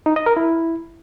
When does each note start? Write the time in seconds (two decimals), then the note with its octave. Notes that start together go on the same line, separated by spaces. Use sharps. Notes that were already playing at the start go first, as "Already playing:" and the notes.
0.06 D#4
0.16 D#5
0.26 A#4
0.37 E4